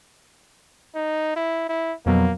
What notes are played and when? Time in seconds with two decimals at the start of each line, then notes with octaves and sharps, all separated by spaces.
0.95 D#4
1.36 E4
1.69 E4
2.06 F2 B2 F#3 A#3